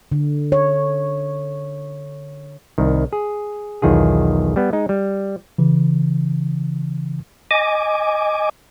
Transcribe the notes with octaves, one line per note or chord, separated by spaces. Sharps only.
D3
C#5
C2 D#3
G#4
B1 E2 D#3 F4 G#4
G3 B3
G#3 D#4
G3
C#3 E3
D#5 G#5 D6